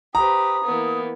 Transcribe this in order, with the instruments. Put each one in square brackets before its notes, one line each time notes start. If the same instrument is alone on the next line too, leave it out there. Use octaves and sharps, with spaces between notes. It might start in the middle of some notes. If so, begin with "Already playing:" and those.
[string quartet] G4 B4 C5 [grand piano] A#5 [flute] D#6
[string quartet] E3 A#3 B3